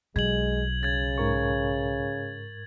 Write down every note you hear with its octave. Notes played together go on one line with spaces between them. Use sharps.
B1 G#3 G#6 F#7
C#3 G#6 A6
G#2 A#4 C#6